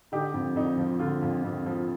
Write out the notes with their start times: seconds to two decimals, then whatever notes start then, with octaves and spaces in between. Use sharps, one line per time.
0.12 D3 D#4 G4
0.34 F2
0.56 F2 D#4
0.78 F3
0.99 D3 F4
1.22 F2
1.44 F2
1.66 F3